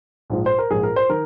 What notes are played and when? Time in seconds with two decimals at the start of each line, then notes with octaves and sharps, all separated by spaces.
0.30 A#1 G#2 F3
0.46 C5
0.58 A#4
0.70 A#1 G#2 F3 G#4
0.83 A#4
0.96 C5
1.10 D#3 A#4